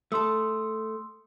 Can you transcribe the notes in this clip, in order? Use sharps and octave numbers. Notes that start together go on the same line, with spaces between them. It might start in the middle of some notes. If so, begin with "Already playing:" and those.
A3 A4 C6 D#6 E6